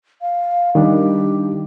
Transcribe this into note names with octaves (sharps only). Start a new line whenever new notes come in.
F5
D#3 G3 D4 G4